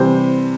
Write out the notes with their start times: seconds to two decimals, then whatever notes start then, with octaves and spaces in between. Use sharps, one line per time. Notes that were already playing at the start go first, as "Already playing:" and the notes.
Already playing: C3 E3 G3 C5